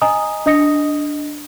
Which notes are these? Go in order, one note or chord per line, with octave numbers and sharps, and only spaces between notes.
D#5 G#5 A#5 D#6
D4 D#5 D#6 A#6 C#7